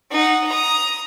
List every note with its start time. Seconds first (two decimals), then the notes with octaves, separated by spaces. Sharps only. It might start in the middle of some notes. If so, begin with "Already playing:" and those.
0.11 D#4 F#5
0.48 A#5 D#6